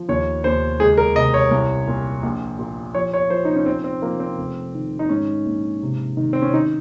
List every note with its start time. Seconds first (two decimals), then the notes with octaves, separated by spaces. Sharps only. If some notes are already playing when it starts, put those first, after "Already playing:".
Already playing: F3
0.09 D#2 C#5
0.44 D#2 C5
0.80 C#2 G#4
0.98 A#4
1.16 C3 D#5
1.34 C#5
1.51 C2
1.87 A#2
2.23 A#1
2.59 A#2
2.95 F3 C#5
3.13 C#5
3.30 F3 C5
3.45 D#4
3.56 C#4
3.66 A#2 C4
3.84 C4
4.02 F3 A#3
4.20 C4
4.38 F1
4.74 D#3
4.99 D#4
5.09 G#2 C#4
5.45 A#1
5.82 C3
6.17 D#3
6.33 C4
6.42 C#4
6.53 D#3 D#4